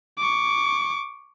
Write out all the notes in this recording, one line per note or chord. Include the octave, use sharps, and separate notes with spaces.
C#6 D6